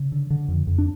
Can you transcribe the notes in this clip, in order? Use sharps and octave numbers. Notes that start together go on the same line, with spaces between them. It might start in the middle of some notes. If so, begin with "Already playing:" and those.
Already playing: C#3
D3
D3
F2
F2
D4